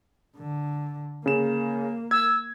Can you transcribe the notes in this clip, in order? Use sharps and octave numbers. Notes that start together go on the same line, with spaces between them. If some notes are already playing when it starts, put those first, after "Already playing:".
D3
C#3 A#3 E7
E6 G#6